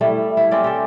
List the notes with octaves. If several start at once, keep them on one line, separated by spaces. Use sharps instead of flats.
G3 A3 E4
E4
C4 C#4 D5
G4 A4